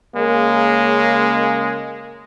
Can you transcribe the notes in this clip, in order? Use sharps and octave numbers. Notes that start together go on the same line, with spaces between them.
C#3 G#3 A#3